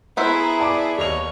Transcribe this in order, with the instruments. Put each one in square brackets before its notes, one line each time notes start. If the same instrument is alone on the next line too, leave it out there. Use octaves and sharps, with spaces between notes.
[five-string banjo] B3 C5 E5 [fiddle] E4 G#4 [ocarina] A#5
[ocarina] D5 [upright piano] A5 D6
[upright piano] D#2 F7 [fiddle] D#4 C#5